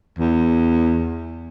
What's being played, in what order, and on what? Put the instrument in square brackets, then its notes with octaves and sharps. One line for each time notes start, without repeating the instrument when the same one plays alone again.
[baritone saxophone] E2